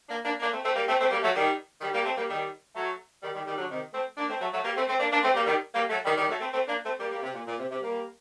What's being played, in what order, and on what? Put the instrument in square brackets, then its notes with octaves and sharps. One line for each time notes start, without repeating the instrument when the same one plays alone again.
[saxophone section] A#3 D4
A#3 D4
A#3 D4
A3 C4
A3 C4
G3 A#3
A3 C4
A3 C4
G3 A#3
F#3 A3
D#3 G3
D#3 G3
G3 A#3
A3 C4
G3 A#3
D#3 G3
F#3 A3
D#3 G3
D#3 G3
D#3 G3
D3 F#3
C3 D#3
A3 C4
A#3 D4
A3 C4
F#3 A3
F#3 A3
G3 A#3
A3 C4
A3 C4
A#3 D4
A#3 D4
A3 C4
G3 A#3
D#3 G3
G3 A#3
F#3 A3
D#3 G3
D#3 G3
F#3 A3
A3 C4
A3 C4
A#3 D4
A3 C4
G3 A#3
G3 A#3
C3
A#2
A#2
C3
C3
G3 A#3